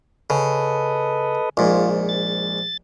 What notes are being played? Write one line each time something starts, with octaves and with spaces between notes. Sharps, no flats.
C#3 A4 B4 D#5
A#1 G#2 F4
A6